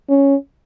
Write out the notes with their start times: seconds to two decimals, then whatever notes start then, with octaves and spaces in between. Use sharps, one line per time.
0.09 C#4